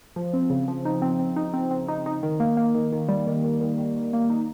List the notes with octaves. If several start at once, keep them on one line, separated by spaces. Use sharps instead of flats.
F3
C4
C#3
F3
D#4
C4
C4
D#4
C4
C4
D#4
D#4
D#3
A#3
A#3
D#3
D#3
G3
D#3
D#3
D#3
D#3
D#3
A#3
D#4